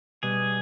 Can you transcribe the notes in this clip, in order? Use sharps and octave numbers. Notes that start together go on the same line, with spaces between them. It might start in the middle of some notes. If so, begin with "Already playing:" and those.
B2 G3 B3 G#4